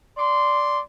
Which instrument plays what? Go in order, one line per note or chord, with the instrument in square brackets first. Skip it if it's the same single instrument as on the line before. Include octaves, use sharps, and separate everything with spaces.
[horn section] D5 C6